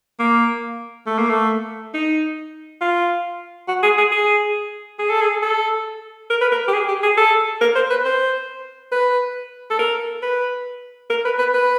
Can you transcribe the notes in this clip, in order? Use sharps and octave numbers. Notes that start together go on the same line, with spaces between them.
A#3
A3
A#3
A3
D#4
F4
F#4
G#4
G#4
G#4
G#4
A4
G#4
A4
A#4
B4
A#4
G4
G#4
G4
G#4
A4
A#4
C5
B4
C5
B4
A4
A#4
B4
A#4
B4
B4
B4